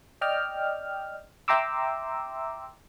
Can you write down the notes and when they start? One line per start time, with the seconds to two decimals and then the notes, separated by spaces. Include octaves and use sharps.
0.21 D5 D#5 G5 F6
1.48 E5 G5 A#5 C6 D6 E6